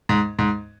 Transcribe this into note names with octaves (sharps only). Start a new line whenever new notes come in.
G#2
G#2